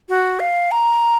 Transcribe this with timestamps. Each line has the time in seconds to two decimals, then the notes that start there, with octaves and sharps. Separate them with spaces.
0.09 F#4
0.40 F5
0.71 A#5